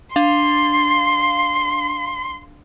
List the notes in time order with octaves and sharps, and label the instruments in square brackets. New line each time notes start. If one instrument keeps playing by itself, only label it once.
[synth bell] D4 F5 [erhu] C6